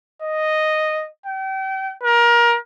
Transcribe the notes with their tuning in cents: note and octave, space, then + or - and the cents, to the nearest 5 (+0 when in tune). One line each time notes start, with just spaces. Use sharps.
D#5 -5
G5 -35
A#4 +25